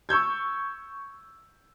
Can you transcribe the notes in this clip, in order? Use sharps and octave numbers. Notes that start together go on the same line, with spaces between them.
C#6 E6 G6 G#6